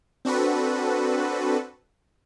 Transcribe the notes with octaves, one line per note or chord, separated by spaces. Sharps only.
C4 D4 F#4 A4 B4